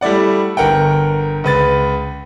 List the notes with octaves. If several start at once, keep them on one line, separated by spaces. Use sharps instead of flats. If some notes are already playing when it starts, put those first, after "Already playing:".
G3 A3 E4 D5 F#5
G1 A#4 F#5 G5
C#2 B4 A6